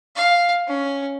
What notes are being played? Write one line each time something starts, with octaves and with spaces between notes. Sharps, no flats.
F5
C#4